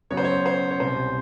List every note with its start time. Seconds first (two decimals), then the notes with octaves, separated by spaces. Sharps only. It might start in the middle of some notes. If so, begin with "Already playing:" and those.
0.10 F#2 C#3 F#3 B3 C#5
0.17 C5
0.25 C#5
0.46 C5
0.71 C#5
0.80 C2 B2 G3 C5